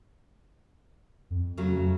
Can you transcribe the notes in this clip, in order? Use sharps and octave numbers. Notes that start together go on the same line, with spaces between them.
F2
C#3 F#3 A3